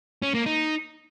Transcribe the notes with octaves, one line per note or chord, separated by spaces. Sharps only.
C#4
A#3
D#4